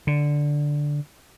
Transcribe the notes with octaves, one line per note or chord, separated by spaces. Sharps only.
D3